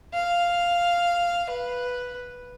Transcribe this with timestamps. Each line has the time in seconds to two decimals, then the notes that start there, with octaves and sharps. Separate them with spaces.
0.13 F5
1.50 B4